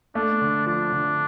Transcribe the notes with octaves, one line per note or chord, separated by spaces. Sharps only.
A3 D4
D3
F3 D4
D3